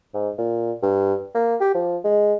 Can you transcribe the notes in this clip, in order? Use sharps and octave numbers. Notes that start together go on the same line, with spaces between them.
G#2
A#2
G2
A#3
G4
F3
G#3